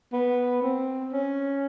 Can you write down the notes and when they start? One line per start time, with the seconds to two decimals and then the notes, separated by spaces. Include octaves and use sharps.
0.13 B3
0.63 C4
1.13 C#4